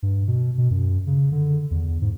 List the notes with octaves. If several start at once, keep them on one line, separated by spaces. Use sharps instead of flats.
G2
B2
B2
F#2
C#3
D3
E2
G#2